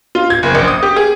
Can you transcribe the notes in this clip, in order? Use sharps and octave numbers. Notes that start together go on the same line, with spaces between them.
F4
G#6
F#1
A#1
D#6
G4
G#4